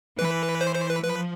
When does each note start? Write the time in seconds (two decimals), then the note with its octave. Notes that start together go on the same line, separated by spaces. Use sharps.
0.19 E3 B4
0.61 C5
0.75 C5
0.90 B4
1.03 F3 B4